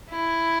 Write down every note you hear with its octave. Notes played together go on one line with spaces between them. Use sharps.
E4